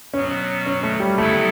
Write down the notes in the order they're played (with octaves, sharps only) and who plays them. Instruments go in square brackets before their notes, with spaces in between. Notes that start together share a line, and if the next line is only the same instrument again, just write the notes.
[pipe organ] B2 F#3 B3 [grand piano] C#4
[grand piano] C#4
A3
G3
[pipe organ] C#3 F#3 B3 E4 A4 [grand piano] A3